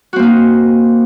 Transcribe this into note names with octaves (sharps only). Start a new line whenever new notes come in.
A#3 C4 D#4 F#4